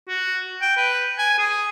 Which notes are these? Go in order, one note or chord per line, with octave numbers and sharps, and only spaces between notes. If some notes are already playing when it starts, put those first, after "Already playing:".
F#4
G5
B4
G#5
G#4